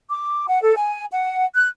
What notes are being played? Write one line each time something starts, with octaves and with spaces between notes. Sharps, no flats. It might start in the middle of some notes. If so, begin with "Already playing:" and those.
D6
F#5
A4
G#5
F#5
F#6